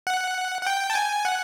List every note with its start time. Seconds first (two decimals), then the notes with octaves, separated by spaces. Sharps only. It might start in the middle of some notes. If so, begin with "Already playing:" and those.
0.07 F#5
0.62 F#5
0.67 G5
0.90 A5
0.95 G#5
1.25 F#5